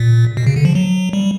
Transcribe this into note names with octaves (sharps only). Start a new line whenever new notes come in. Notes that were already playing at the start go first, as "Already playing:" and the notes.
Already playing: A#2
B2
C#3
D3
F3
F#3
G3